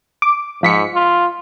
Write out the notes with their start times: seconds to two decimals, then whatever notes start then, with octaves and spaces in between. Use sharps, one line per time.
0.22 D6
0.63 G#2 F3 B6 C#7
0.95 F4